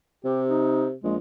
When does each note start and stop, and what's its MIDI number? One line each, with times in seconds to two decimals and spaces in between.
0.25 0.94 48
0.25 0.42 67
0.49 0.86 63
1.04 1.18 34
1.04 1.15 56